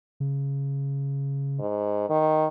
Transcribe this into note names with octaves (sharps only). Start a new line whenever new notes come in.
C#3
G#2
D#3